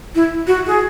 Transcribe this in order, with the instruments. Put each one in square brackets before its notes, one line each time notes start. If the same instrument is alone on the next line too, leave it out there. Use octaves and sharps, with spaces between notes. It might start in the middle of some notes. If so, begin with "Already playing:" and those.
[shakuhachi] E4
F#4
G#4